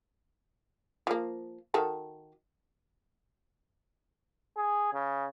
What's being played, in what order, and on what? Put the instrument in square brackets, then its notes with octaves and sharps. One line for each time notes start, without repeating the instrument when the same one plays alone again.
[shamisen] F3 A#3
D#3 F#4 A4
[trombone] G#4
C#3